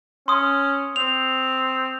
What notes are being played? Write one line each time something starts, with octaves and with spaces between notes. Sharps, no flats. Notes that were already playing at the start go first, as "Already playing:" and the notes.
C#4 C6 D#6
C4 F7